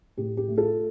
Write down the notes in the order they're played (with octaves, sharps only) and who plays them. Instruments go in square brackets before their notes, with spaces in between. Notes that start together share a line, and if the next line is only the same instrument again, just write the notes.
[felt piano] A2 G4
G4
A3
F4 A4